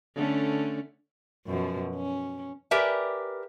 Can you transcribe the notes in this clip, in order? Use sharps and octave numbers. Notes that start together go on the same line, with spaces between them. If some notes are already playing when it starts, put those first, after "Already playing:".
D3 A3 C#4
F#2 B2 F3
C#4
G4 A#4 B4 D5 E5 G#5